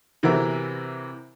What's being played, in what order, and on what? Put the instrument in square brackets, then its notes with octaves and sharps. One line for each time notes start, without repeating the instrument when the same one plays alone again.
[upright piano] C3 E3 C4 E4 F#4 A#4